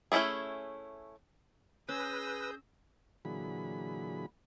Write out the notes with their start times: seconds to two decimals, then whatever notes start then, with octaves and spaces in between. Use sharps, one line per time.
0.12 A3 C#4 D#4 E4 G#4
1.89 C#4 G#4 B4 D#6 E6 G6 A#6
3.25 A#2 D3 E3 F#3 G#4 B5